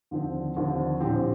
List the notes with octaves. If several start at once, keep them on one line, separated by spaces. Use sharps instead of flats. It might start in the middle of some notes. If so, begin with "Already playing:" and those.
D#2 D3 F3 C4
D#2 D3 F3 C4
A#1 A2 F3 C4 G4